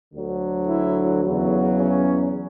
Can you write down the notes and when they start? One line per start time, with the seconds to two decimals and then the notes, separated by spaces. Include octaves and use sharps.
0.12 D2 D3 F#3
0.68 E4
1.23 E2 C#3 F#3
1.79 C#4